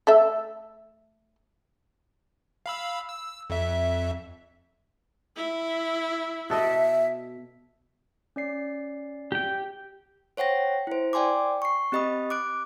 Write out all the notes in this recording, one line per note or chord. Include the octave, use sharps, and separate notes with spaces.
A3 A4 E5
F5 B5 E6
E6
F2 E5
E4
B2 A4 D#5 E5
C#4 D5 C7
G4 G5
C5 C#5 F#5 G5 A#6
E4 C5
D5 G5 G#5 C6 D6
C#6 C7
C4 G4 D#5 B5 D#6
D6 F#6 D7